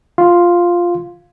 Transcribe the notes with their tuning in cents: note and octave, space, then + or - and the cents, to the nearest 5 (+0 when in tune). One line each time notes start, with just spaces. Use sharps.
F4 +0 F5 +0 C6 +0